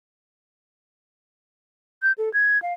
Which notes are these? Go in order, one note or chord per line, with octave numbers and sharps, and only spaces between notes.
G6
A4
G#6
F5